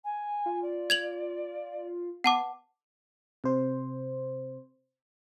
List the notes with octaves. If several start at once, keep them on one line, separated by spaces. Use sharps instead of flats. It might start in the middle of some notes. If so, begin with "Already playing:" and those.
G#5
F4
D5
G#6 F7 F#7
B3 F#5 A5 D6
C3 C5